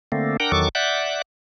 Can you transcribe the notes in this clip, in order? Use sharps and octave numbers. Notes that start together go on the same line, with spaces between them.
D3 A3 A#3 C4
D4 A#4 F#5 G5 A#5
E2 D#3 F#3 A4 C#6 D6
D5 E5 F#5 D6 F#6 G6